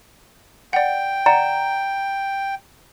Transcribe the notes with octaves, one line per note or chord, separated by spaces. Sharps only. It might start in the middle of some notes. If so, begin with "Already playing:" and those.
D5 F#5 G5
D5 F#5 A#5